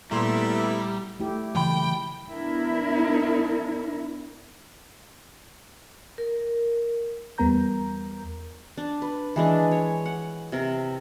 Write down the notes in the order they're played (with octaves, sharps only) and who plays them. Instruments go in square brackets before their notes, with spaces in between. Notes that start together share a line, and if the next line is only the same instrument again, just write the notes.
[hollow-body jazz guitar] A#2 C6 [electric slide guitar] G3 [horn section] A3 B3 E4 [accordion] A#5
[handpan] A3 E4 G4
[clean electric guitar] D#2 B5 [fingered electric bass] C#3 E3 F#3 [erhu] G5
[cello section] B3 D4 E4 A#4
[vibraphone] A#4
[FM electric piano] E2 G3 B3 A#4 A#5 G6
[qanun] D4
B4
E3 G#3 D4
C#5
F#5
C3 A#4